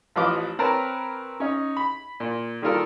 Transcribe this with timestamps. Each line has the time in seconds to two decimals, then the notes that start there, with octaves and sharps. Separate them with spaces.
0.16 A1 F3 B4 D#5 F5 D6
0.59 C4 A#4 B4 C#5 A5 A#5
1.40 C#4 D#4
1.77 B5
2.20 A#2
2.62 D#3 G3 A#3 F4 A4 A#4